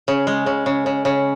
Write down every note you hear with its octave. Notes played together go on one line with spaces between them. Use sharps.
C#3
G#3
C#3
C#3
C#3
C#3